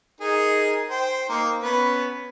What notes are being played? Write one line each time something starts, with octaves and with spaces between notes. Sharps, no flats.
D#4 G#4 A#4
C5 G5
A#3 D#4
B3 C#4 B4